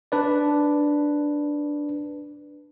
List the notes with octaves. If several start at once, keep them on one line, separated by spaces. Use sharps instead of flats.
D4 B4 D5